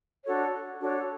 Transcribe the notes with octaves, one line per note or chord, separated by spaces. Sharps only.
D4 F#4 A4 C#5
D4 F#4 A4 C#5